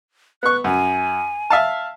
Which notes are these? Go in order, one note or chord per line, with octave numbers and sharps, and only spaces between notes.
B3 C#6 F#6
F#2 G#5
E5 F5 A5